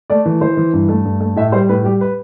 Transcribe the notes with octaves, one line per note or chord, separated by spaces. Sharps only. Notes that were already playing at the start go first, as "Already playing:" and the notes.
A3 D5
E3
E3 C5
E3
G2
A3
G2
A3
A2 E5
G3 C5
A2 B4
G3 G4
B4